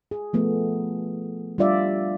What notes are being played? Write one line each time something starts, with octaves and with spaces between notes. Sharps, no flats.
G#4
F3 A3 B3
G3 D4 F4 D5 E5